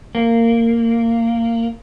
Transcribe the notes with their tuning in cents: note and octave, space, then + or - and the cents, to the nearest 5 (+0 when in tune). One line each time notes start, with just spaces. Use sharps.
A#3 -15